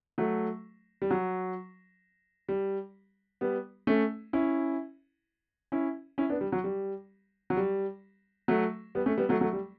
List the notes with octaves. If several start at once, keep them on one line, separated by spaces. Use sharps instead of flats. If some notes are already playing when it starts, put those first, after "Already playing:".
F#3 A3
G3
F#3
G3
G3 B3
A3 C#4
C#4 E4
C#4 E4
C#4 E4
B3 D4
G3
F#3
G3
F#3
G3
F#3 A3
G3 B3
A3 C#4
G3 B3
F#3 A3
F#3 A3
G3